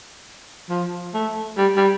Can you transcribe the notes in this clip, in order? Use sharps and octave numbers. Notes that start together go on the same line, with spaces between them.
F3
A3
G3
G3